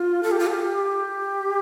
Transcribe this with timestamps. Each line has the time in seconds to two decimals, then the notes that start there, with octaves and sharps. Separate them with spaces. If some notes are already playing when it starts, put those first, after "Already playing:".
Already playing: F4
0.23 A4
0.31 G4
0.39 F4
0.47 A4
0.52 G4